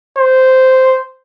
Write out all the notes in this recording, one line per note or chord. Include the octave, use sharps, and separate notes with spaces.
C5